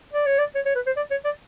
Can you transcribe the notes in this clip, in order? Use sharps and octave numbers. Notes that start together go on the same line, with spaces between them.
D5
C#5
D5
C#5
C#5
B4
C5
D5
C#5
D5